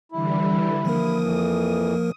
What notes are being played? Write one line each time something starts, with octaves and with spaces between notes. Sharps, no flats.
D3 E3 G3 E4
F3 A#3 A#4 D#6
F2 E3